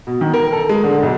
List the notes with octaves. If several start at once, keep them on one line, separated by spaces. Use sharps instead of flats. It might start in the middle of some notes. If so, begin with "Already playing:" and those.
B2
D#3
A#4
A4
G#3
D3
B1